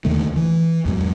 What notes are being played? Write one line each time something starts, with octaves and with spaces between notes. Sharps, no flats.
D#2 D3 D#3 A3
E3
E2 G#2 F#3